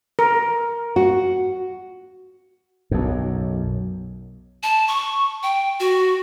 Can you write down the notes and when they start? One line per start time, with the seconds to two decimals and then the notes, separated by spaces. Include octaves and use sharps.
0.19 A#4
0.96 F#4
2.91 B1 F#2
4.63 A5
4.88 C#6
5.43 G5
5.80 F#4